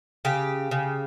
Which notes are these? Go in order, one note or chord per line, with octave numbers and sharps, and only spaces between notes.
C#3 G4
C#3